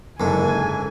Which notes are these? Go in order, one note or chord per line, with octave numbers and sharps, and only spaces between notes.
F#1 G#2 D3 G#5